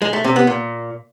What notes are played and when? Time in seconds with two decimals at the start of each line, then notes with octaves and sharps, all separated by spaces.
0.02 G#3
0.13 A3
0.24 C3
0.36 B3
0.47 A#2